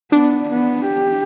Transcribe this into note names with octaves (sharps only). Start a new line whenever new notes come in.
B3 D4
B3
G4